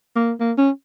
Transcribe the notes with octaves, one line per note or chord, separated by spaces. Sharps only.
A#3
A#3
C#4